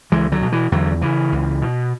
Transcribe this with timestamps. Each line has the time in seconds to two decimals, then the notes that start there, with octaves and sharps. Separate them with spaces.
0.12 C#2 E3 G#3
0.32 D3 F#3
0.42 B2
0.52 E3
0.72 E2 D3 F#3
1.02 C#3 E3
1.32 C#2
1.62 B2